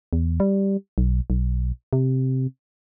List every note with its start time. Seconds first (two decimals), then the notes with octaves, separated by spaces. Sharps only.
0.13 E2
0.40 G3
0.98 B1
1.30 B1
1.93 C3